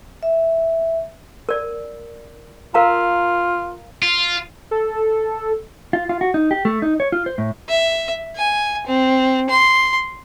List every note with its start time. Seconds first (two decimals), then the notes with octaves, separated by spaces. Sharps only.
0.23 E5
1.49 A#4 D5
2.74 F4 A#4 F5 A#5
4.02 F4
4.71 A4
5.93 F4
6.09 F4
6.21 F#4
6.34 D#4
6.51 G4
6.65 A3
6.82 D#4
7.00 C#5
7.12 F4
7.26 C5
7.38 A2
7.68 E5
8.36 G#5
8.87 C4
9.50 C6